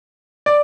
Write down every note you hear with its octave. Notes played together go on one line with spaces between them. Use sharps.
D5